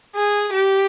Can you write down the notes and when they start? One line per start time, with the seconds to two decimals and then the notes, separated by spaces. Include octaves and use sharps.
0.16 G#4
0.53 G4